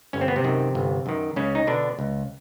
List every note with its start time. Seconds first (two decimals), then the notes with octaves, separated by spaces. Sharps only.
0.13 G1 C#4
0.21 C4
0.28 B3
0.36 C3 C4
0.44 F#2 D#3
0.75 G1
1.06 F#2 D#3
1.36 C#2 C#3 C#4
1.55 D#4
1.67 B2 D3 D4
1.99 C#2